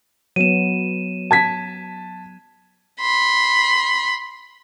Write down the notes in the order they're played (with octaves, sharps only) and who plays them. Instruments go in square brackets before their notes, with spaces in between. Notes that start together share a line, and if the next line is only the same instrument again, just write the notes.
[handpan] F#3 B3 [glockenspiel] D#7 E7
[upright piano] A5 G#6 B6
[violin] B5 C6